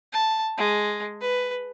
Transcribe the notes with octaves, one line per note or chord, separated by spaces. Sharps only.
A5
G#3
B4